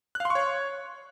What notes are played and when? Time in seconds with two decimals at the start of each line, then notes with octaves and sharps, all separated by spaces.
0.15 F#6
0.20 F5
0.25 C6
0.30 C#6
0.35 C#5